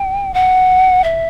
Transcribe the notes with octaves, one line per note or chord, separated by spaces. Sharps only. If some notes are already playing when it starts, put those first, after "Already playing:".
Already playing: G5
F#5
E5